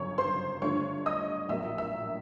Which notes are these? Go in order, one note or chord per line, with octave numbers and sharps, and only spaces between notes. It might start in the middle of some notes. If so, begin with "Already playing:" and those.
Already playing: G1 F#2 C#3 C#5 C#6
C5 C6
G2 D3 F3 A3 D4 C#5 C#6
D#5 D#6
A#1 A2 F#3 A#3 E5 E6
E5 E6